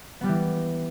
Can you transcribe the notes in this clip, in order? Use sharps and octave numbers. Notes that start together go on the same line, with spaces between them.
E3 G3 B3 G4